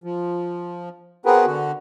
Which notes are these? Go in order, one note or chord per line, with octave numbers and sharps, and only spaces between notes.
F3
B3 C4 F#4 G#4 A#4 B4
D3 F#4